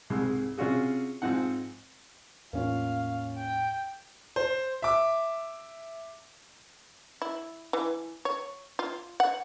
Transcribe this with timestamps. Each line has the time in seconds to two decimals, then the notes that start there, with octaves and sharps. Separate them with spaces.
0.10 C2 G#2 C3 G#3
0.58 C3 C#4 F4 F#4 G#4
1.22 G#2 F3 C4 D#4 F#5
2.53 E2 A2 A#3 C#4 F4 F5
3.37 G5
4.36 C5
4.82 E5 D6
7.22 E4
7.73 E3
8.25 C#5
8.79 F4
9.20 F#5